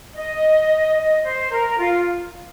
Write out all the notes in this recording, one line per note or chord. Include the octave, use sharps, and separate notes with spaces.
D#5
D#5
C5
A#4
F4